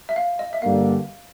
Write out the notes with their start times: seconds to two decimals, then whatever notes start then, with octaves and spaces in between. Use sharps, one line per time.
0.09 E5
0.16 F5
0.39 D#5
0.53 E5
0.62 G2 D3 G3 A#3 F5